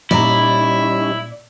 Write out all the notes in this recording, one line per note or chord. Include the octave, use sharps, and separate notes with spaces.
A#2 G3 C#4 D#4 E4 D5 A#5